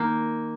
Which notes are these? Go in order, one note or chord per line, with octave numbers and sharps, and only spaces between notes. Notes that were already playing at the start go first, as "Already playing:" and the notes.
Already playing: D#3 A#3